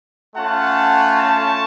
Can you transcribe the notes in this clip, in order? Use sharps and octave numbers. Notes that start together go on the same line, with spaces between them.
A3 C#4 F4 F#5 A5
A5 C#6